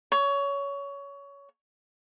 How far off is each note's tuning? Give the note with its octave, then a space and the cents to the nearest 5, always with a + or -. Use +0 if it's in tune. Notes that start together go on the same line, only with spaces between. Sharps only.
C#5 +20